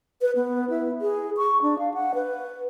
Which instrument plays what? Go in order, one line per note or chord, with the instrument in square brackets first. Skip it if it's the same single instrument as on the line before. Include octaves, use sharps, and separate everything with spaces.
[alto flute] B4
B3
E4
G#4
C#6
D4
F5
F#5
B4